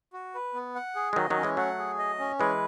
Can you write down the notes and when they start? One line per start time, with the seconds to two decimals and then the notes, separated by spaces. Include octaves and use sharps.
0.13 F#4
0.35 B4
0.54 B3
0.75 F#5
0.95 G#4
1.13 G#3
1.16 D#3 F#3 D#5
1.30 D#3 F#3
1.36 C#4
1.43 E3 G#3
1.57 F#3 A3 F#5
1.78 G#4
1.99 D#5
2.19 C#4
2.40 E3 G#3 B4